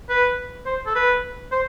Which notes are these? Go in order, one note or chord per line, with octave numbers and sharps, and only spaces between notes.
B4
C5
A4
B4
C5